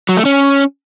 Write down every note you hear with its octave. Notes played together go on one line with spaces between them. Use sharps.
F#3
A3
C#4